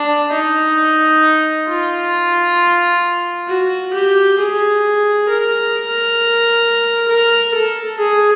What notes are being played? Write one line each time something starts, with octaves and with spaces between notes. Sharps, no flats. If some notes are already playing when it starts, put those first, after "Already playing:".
Already playing: D4
D#4
F4
F#4
G4
G#4
A#4
A#4
A4
G#4